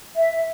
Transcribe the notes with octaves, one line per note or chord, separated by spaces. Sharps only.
E5